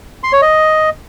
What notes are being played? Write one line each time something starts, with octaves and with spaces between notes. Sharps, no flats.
C6
C#5
D#5